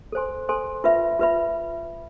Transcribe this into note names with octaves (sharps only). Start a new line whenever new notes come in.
A4 C5 G#5 C6
A4 C5 G#5 C6
F4 B4 E5 B5
F4 B4 E5 B5